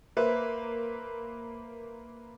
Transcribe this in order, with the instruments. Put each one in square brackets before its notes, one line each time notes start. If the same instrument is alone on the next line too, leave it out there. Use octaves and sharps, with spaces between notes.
[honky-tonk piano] A#3 B4 C5 E5